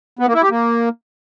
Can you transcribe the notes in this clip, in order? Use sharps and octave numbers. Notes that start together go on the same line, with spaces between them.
B3
A#3
E4
G4
A#3